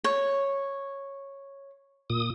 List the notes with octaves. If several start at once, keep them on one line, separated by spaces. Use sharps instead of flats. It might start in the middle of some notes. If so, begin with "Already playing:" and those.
C#5
A#2 D#6